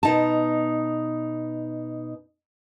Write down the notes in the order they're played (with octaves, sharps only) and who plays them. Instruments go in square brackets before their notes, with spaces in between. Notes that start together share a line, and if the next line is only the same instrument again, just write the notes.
[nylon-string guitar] B2 D#4 A5